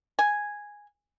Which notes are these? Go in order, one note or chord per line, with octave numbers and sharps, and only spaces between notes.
G#5